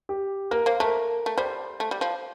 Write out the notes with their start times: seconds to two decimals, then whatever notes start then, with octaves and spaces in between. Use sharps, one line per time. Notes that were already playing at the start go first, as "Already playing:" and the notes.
0.09 G4
0.51 A#3 A#4
0.66 A#3 C5
0.80 A3 A#4
1.26 A3
1.37 G3 C5
1.80 A3
1.91 G3
2.01 F3